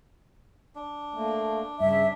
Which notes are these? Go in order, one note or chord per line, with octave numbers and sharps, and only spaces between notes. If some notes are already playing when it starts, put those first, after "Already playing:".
D4
A3 A#3
G2 C#3 E5